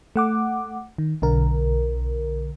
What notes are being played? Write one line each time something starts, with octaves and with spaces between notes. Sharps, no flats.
A3 F#5 D6
D#3
B1 D3 A#4